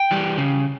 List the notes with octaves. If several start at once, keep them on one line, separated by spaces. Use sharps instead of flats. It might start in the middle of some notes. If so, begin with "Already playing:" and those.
Already playing: G5
E3 G3
C#3